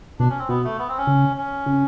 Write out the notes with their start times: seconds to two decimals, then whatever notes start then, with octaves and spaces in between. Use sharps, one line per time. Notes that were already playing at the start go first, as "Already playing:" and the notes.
0.19 B2 D4
0.30 C#4
0.39 C4
0.49 B2 B3
0.64 A3
0.79 B3
0.89 C4
0.97 C#4
1.07 C#3
1.37 C#4
1.66 C#3